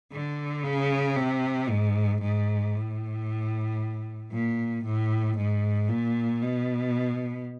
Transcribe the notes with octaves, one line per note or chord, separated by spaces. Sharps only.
D3
C#3
C3
G#2
G#2
A2
A#2
A2
G#2
A#2
B2